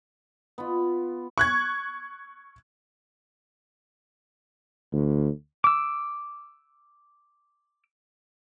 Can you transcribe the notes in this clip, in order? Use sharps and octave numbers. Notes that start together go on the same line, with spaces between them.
B3 F4
C#6 F#6 G#6
D2
D6 E6